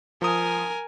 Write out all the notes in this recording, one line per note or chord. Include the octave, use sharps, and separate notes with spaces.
F3 A#4 G#5 D#6